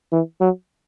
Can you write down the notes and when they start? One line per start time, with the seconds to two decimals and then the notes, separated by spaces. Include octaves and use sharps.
0.12 E3
0.41 F#3